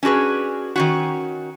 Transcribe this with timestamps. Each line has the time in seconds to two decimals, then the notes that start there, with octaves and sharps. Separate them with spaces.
0.03 C#4 D4 F#4 G#4 B4
0.76 D#3 C#4 F#4